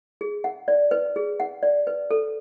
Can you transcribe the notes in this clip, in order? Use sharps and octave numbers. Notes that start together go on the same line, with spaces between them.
G#4
F#5
D5
B4
G#4
F#5
D5
B4
A4